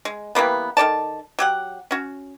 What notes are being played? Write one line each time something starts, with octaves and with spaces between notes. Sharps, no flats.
G#3
E3 G3 A#3 B3
D#3 A4 D5 A5
F#3 G4 F#5
C#4 F#4